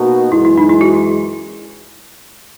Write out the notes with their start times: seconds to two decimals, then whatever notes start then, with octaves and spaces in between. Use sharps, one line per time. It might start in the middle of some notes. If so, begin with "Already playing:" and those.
Already playing: B2 A#3 D#4 F#4
0.32 F#2 E3 G#3 E4
0.45 E4
0.58 D#4
0.69 E4
0.81 F#4